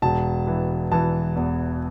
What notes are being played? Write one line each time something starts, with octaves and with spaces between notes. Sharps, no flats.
E1 A5
E3
E3 A5
E2